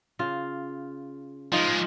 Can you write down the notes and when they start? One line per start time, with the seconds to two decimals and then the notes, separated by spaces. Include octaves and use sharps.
0.19 C#3 F4
1.52 F3 G#3 D#4 F4